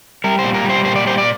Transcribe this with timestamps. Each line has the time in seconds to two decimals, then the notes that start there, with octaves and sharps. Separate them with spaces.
0.24 G3 A#4
0.39 C5
0.44 A#2
0.54 A#4
0.65 G3 C5
0.85 A#2 C5
0.96 D5
1.05 G3 C5
1.18 D5